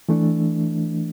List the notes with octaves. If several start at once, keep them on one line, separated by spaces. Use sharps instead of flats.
E3 A3 D4